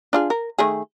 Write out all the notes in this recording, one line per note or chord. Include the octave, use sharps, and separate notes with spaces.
D4 F4 G#4
A#4
D#3 A3 G#4